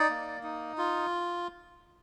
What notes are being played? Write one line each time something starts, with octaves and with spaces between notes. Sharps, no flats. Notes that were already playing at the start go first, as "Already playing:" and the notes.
Already playing: D#4 D5
A#3
D#4
F4